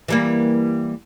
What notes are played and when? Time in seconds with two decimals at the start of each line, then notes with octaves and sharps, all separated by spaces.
0.08 E3 G3 A#3